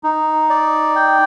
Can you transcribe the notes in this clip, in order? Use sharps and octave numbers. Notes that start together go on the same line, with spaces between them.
D#4
D5
G5